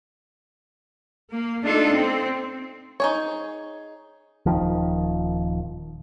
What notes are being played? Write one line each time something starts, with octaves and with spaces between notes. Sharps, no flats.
A#3
A3 D4 D#4 F4 A4
C4
D#4 G#4 C#5
D#1 A#1 D#3 F3